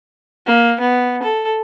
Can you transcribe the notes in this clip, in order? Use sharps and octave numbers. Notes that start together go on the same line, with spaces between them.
A#3
B3
A4